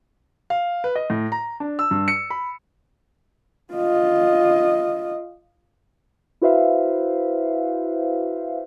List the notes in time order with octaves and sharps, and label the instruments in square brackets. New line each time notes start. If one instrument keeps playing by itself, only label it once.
[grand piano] F5
B4
D#5
A2
A#5
D4
E6
G2
C#7
B5
[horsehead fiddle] F4 D#5
[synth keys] E4 F#4 B4 C5 E5 F5